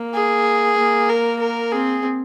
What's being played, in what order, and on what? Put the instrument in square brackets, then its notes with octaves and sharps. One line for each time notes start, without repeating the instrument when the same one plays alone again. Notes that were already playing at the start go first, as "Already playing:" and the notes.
Already playing: [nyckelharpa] A#3
[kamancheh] G#4
[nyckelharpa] A#3
[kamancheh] A#4
A#4
[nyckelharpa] C4 [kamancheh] G#4